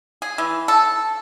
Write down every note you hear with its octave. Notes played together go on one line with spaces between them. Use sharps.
G#4
E3
A4